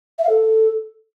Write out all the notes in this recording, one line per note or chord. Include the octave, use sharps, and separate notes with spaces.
E5
F5
A4